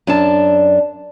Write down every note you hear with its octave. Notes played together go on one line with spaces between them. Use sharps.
F#2 D4 A5